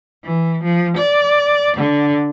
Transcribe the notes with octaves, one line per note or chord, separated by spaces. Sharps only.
E3
F3
D5
D3